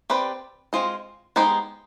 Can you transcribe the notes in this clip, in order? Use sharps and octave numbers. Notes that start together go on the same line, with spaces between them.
C4 G4 B4 D5
G#3 C4 F4 C5 D#5
G#3 B3 D#4 G4 C5